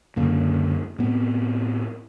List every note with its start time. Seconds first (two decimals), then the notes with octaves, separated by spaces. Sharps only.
0.16 C#2 F#2 D3 A#3
0.99 A2 B3 C4